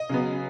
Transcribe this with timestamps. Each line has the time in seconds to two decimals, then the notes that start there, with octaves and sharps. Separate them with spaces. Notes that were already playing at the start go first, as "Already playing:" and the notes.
Already playing: D#5
0.09 C#3 F#3 B3